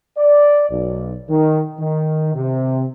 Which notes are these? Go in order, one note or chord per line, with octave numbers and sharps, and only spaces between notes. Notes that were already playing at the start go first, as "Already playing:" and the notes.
D5
B1
D#3
D#3
C3